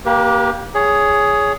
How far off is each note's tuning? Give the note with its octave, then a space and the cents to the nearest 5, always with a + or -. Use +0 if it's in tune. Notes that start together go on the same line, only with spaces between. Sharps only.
A#3 +5 G4 +0 B4 -45
G#4 +0 C#5 +15